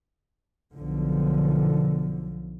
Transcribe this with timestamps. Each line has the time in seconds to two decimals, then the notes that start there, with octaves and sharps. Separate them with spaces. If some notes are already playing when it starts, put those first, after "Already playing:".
0.73 B1 D3 F3